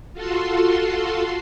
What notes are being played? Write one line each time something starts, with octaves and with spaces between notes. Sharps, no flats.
F4 F#4 A4 C6